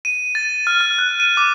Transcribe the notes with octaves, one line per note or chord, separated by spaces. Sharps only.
D#7
A6
F6
F6
F#6
D#7
D6